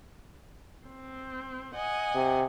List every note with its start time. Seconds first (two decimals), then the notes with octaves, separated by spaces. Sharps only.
0.88 C4
1.75 D#5 F#5 G#5
2.15 C3